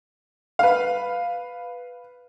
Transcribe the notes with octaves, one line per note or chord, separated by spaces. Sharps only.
B4 F5